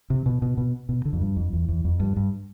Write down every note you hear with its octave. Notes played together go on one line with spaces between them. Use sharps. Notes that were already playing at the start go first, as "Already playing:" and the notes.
C3
B2
B2
B2
B2
D3
F2
G2
F2
E2
E2
F2
G2
G2